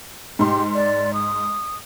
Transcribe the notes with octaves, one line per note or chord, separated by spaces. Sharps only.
G#2 G4 C6
D5
D#6